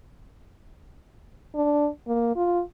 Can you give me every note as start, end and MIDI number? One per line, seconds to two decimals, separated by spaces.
1.55 1.88 62
2.07 2.35 58
2.36 2.61 65